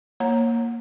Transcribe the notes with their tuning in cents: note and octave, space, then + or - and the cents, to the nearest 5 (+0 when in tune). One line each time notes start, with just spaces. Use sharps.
A#3 +0 C#5 -20 A#5 +0